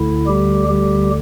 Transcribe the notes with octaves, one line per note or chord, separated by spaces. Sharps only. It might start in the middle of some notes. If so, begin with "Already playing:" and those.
Already playing: D2 D3 E4
G3 G4
G3 G4